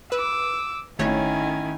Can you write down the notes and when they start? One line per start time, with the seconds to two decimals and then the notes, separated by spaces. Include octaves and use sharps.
0.12 B4 D6 E6
0.99 G#1 D#3 A3 C#4 E4 C#5 G#5